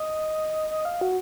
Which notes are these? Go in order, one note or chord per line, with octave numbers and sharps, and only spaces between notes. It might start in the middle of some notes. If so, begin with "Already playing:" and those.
Already playing: D#5
D#5
F5
F#4